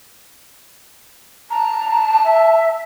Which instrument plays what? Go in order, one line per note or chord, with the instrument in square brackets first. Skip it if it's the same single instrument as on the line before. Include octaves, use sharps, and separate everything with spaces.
[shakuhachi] A5 [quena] A#5
[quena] E5